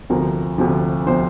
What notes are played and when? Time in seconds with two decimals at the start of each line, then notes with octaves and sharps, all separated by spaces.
0.10 D2 C3 F3 A#4
0.58 D2 C3 F3
1.06 C3 F3 C5